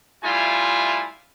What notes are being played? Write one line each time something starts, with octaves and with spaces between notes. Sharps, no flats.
G3 A3 E4 F4 G#5